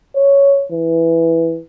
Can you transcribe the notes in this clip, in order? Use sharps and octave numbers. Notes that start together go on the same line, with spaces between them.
C#5
E3